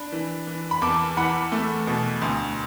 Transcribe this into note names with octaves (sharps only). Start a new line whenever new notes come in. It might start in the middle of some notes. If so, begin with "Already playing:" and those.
Already playing: D4 B5
E3
E3
B5
E2 A5 D6
E3 F#5 B5
A3
B2
D2